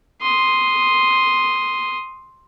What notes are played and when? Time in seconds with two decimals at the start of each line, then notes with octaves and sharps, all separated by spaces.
0.21 C6 D#6